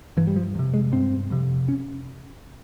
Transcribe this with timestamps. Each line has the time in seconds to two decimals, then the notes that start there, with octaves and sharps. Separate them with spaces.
0.17 G2 E3
0.27 G3
0.36 F3
0.55 F2 C3
0.74 G#3
0.92 G2 C4
1.30 F2 C3
1.68 C#4